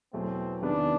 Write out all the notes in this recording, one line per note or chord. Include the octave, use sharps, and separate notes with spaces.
E2 B2 F#3 A3 C4
E2 C3 D#3 G3 B3 D4